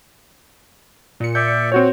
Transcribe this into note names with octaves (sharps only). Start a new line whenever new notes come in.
A#2 C#7
D5 E5 G6
C4 F#4 C#5